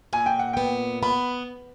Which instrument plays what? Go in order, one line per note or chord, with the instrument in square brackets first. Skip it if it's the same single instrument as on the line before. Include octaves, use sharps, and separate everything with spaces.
[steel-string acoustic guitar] A#2 [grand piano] G#5
[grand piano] G5
F#5
[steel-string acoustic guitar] B3 [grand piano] G5
[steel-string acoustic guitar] B3 [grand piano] B5